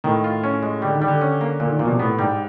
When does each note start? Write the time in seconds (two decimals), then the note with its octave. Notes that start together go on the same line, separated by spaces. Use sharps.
0.04 A2 D#3
0.24 F4
0.44 C#4
0.63 G#3
0.82 D3 G3
0.95 D#3
1.02 G3
1.08 D3
1.21 C#4
1.41 A#3
1.60 A#2 D3
1.69 D#3
1.79 A#2 F3
1.85 B2
1.90 C3
1.99 A2 B3
2.18 G#2 G3